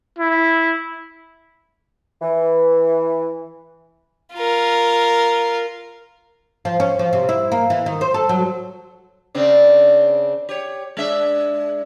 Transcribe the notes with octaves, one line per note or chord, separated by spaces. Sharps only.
E4
E3
F4 A#4
F3
C#4
F3
C3
E4
A#3
E3
D#3
C5
A4
F#3
C#3 C4 D4
G4 C#5
G#3 D4 E5